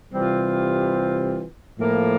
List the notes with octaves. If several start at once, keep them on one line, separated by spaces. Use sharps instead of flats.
C3 E3 G3 C4 F4
A2 F3 A#3